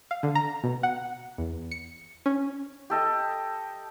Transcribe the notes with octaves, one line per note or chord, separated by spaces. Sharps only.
F5
D3
A#5
B2
F#5
E2
C#7
C#4
G4 A4 D#5